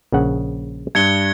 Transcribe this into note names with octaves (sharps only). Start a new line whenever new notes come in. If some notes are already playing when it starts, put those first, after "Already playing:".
A#1 C#3 F#5
G2 G#6 C#7 G7